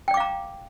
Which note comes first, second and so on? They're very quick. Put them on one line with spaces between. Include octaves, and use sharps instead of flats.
G5 D5 D6 F5 A#5